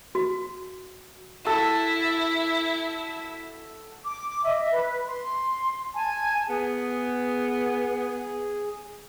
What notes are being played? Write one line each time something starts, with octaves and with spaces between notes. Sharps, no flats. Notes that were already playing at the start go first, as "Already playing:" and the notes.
F#4
E4 F#4 A4
D6
D#5 E5
B4
C6
G#5 A5
B3 G#4